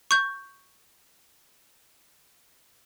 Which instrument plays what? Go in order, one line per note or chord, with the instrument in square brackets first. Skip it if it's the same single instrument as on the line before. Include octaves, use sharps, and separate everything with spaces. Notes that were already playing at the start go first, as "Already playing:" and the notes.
[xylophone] C#6 G6